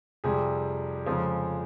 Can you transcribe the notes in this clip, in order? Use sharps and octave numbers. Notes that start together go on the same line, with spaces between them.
F2 C3 G3 G#4
F2 C#3 F3 G#3